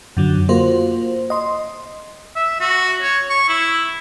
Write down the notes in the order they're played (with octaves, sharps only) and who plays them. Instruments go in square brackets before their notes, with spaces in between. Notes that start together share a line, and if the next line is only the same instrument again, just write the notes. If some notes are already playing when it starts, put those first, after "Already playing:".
[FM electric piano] F#2 D3 F#3
A#3 F4 F#4 C5
D#5 C6
[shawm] E5
F#4
C#5
C#6
E4